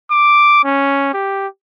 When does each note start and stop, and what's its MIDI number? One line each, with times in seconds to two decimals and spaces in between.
0.11 0.63 86
0.64 1.12 61
1.14 1.47 67